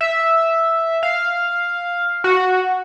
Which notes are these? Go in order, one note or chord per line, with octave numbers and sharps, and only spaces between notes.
E5
F5
F#4